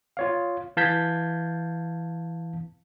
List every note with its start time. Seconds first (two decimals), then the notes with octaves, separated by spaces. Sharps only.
0.17 F4 C#5 F5
0.77 E3 F5 A5 G6 G#6 B6